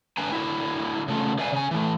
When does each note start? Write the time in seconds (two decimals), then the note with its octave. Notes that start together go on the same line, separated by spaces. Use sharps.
0.18 D4 B4 G5 G#5 A#5
0.32 D3 F#3 E4
1.08 C#3 A3 F4
1.38 B4 D5 E5 F5 G5 G#5
1.52 C#3 G#5
1.71 E3 A3